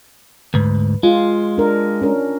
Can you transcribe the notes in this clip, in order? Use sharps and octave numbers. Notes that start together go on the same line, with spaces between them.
D2 G#2 B4
G#3 F4
D4 A#4
C#4 D4 A#4